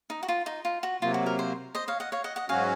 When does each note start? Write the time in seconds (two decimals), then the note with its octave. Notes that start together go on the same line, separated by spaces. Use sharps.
0.10 D#4
0.23 F#4
0.28 F4
0.46 D#4
0.65 F4
0.83 F#4
1.02 C3 F#3 A#3 F4
1.14 F#4
1.26 A#4
1.39 C5
1.75 C5 D#5
1.88 C#5 F5
2.00 D#5 F#5
2.12 C#5 F5
2.24 D#5 F#5
2.36 D#5 F#5
2.49 G#2 F#3 C#4 F#4 F5 G#5